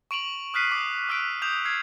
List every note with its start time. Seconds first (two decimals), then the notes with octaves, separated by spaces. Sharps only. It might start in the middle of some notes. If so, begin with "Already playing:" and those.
0.11 C#6 D7 F7 F#7
0.54 D#6 F6 F#6 B6 C7 D#7
0.71 D6 D#6
1.09 D6 E6 F#6 B6 D7
1.42 D#6 G6 E7 F7
1.65 F6 G#6 C7